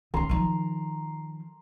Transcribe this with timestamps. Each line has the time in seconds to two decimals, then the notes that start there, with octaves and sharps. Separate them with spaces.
0.14 D#3 C#4 A#5 C6
0.29 D#3 F3